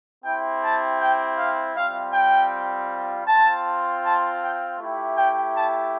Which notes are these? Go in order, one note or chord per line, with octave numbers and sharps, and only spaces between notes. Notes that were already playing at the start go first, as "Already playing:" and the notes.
C4 E4 G4 G5
A5
G5
F5
G3 C4 F4 F5
G5
C4 F4 A5
A5
G5
A3 E4 G4
G5
A5